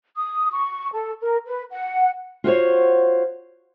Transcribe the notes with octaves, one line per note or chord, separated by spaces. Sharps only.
D#6
C#6
A4
A#4
B4
F#5
F4 F#4 C5 C#5